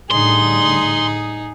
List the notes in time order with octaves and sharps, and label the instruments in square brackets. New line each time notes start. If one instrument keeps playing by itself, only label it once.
[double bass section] A2 D3 G3 [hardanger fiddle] D#4 G#4 [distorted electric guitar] C6